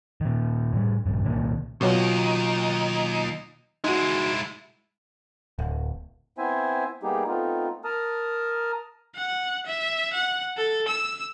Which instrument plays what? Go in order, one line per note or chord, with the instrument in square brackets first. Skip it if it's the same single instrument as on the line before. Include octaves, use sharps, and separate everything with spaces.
[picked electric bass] A#2 D#3
A2 G3
A#1 G2
C2 A#2 D#3 A#3
[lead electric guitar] D#2 D#4 [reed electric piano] B2 F#3 F4
[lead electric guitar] G#3 E4 [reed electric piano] D#4 F#4
[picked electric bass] D1
[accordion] B3 C4 E4 C5 E5 G#5
G3 A#3 B3 D#4 G4 G#4
A3 B3 C4 D#4 F4
A#4 A5 A#5 D#6 F6
[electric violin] F#5
E5
F#5
A4
E6